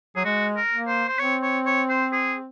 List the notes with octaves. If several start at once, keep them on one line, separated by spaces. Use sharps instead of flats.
F#3 G#4
G#3 F#4
A#4
A#3
C5
C5
C4 C#5
C#5
C#5
C5
G#4